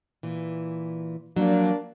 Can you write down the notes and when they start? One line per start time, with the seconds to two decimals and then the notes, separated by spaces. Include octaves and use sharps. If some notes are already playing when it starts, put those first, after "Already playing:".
0.23 A#2 E3
1.36 F3 F#3 A#3 D4